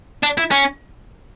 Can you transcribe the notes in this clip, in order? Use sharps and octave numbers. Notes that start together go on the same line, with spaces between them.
D4
E4
C#4